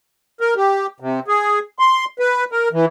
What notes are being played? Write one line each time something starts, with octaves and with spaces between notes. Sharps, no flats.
A#4
G4
C3
G#4
C6
B4
A#4
E3